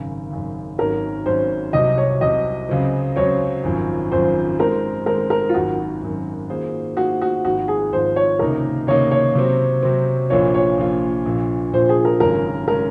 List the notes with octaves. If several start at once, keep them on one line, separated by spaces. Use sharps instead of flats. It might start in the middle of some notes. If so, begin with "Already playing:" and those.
Already playing: G#1 F#2 C#3
G#1 F#2 C#3
G#1 G#2 F#3 C#4 A#4
G#1 G#2 F#3 C#4 C5
C2 C3 F#3 D#5
C#5
C2 C3 F#3 D#5
C#2 C#3 F#3 C4
C#2 C#3 F#3 C4 C#5
G#1 F#2 F3
G#1 F#2 F3 C5
D#3 G#3 C4 A#4
D#3 G#3 C4 A#4
A#4
F4
G#1 F#2 D#3 F#4
G#1 F#2 D#3
D#3 A#3 F4 G#4 C5
D#3 A#3 F4 F#4 G#4 C5
F#4
G#1 G#2 F3 F#4
G#4
G#1 G#2 F3 C5
C#5
C#2 C3 D#3 A#3 D#4 A#4
C#2 C3 D#3 A#3 D#4 C#5
C#5
C3 F#3 C4
C3 F#3 C4
A#1 A#2 F3 A#3 F4 C#5
C#5
A#1 A#2 F3 A#3 F4
A#1 A#2 F3
A#1 A#2 F3 C5
G#4
A#4
G#1 F#2 C#3 G#3 C#4 A#4
C#3 G#3 C#4 A#4